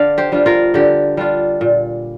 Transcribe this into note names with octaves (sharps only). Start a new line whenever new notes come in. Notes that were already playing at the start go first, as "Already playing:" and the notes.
Already playing: D3 D5 F5
G4 C5
G3 D4 F4
F4 A#4
D3 G4
G3 D4 F4
A#2